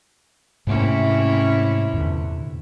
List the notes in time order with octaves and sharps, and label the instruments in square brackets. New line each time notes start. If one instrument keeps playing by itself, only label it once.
[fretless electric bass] G#2 A3 A#3 [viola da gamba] C3 C#4 E4
[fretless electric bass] E2 A#2 D3